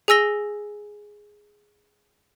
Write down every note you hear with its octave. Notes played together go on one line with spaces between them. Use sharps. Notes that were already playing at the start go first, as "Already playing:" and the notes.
G#4 G#5 E6 A#6 G7